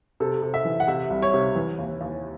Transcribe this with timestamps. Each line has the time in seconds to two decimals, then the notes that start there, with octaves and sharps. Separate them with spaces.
0.20 C3 A4
0.42 C3
0.54 E5
0.65 E3
0.80 F#5
0.87 C3 E5
1.10 C2
1.22 C#5
1.34 C3
1.56 E3
1.79 D#2
2.01 D#2